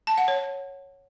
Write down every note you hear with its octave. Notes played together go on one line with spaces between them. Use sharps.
A5
F#5
C#5